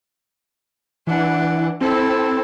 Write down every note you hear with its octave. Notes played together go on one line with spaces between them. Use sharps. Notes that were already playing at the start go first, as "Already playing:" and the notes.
E3 D4 F#5
C4 E4 A4